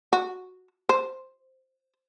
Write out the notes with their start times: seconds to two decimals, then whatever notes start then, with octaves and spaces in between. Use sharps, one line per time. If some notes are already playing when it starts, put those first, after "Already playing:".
0.13 F#4
0.89 C5